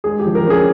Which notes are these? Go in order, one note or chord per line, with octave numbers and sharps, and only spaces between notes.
G#3 G#4
G4
F3
A#4
C#4 G#4